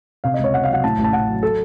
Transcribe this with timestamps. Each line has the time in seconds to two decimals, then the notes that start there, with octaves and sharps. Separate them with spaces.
0.24 C3 F5
0.34 D#5
0.39 C#2
0.44 C#5
0.54 C#2 F#5
0.64 F5
0.69 F#3 F#5
0.84 A2 A5
0.98 A1
1.04 A5
1.13 A1 F#5
1.28 F#3
1.43 A4